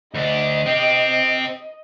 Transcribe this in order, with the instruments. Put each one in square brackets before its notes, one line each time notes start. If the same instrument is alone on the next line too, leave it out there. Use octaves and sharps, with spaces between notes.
[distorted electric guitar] D2 D4 [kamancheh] D#5
[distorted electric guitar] C4 G4